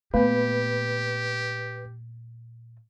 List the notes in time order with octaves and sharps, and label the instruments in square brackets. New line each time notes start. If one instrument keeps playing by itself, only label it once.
[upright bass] A#2 [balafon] A3 B3 [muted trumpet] G4 [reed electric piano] B4